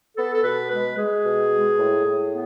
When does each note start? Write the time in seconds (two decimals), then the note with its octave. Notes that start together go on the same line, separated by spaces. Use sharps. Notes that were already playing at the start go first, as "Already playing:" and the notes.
0.17 B3 A4
0.34 A4
0.44 B2 B4
0.71 G#3 B4
0.97 G#3 G#4
1.24 B2
1.51 G#3
1.78 A2
2.05 A2
2.31 B3